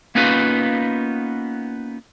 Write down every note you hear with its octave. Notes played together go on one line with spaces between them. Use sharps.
A#3 B3 C#4 D#4 F4 B4